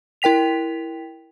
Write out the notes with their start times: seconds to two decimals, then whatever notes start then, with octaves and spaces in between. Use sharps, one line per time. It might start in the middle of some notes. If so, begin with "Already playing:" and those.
0.22 E4 A#4 G5 B6 F7